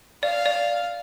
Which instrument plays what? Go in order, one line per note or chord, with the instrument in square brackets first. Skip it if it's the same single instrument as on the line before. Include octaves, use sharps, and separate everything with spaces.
[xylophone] D5 [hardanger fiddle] F5
[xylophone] D5